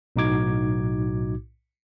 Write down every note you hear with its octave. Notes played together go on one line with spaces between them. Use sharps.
B1 A2 D#4 F#4 D6 G#6